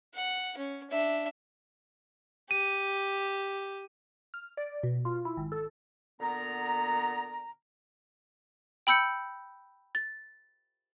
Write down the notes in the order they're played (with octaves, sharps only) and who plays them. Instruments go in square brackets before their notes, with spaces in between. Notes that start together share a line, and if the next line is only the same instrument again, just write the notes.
[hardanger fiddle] F#5
C#4
D4 E5
[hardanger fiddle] G4 [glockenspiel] D#7
[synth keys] F6
D5
B2
F4
E4
G#1
A4
[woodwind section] A#2 D3 B3 A#5
[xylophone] G5 B5 E6 G6 C#7
A6